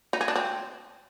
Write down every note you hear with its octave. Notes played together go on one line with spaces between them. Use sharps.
D#4
G#4
D4
C4